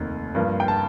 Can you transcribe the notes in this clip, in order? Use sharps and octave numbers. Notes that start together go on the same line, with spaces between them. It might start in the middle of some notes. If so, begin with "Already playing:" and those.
Already playing: F1 D#2 D#3
G2 F3 A#3
G5
A5